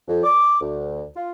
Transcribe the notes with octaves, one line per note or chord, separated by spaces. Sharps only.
F2
D6
D2
F4